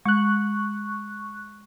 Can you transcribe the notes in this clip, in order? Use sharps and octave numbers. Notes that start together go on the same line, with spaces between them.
G#3 C#6 F#6